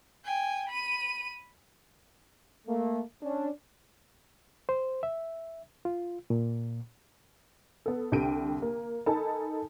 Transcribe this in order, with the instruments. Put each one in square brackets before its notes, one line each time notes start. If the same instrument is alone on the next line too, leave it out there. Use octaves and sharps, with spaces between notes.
[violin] G5 G#5
B5 D#7
[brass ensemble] A3 A#3
C#4 D4
[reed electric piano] C5
E5
F4
A#2
[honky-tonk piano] B3 A4
C2 D3 G4 G5 D7 D#7
A#3
D#4 A4 A#4 G#5 A5 B5